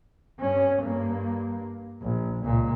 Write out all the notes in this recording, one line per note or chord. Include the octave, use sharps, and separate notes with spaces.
G2 C#4
G2 A#3
A#1
C#2 A#2